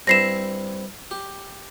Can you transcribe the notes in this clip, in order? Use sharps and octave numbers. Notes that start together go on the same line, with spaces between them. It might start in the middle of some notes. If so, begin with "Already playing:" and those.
G2 C4 E4 A#6 C7 E7
G4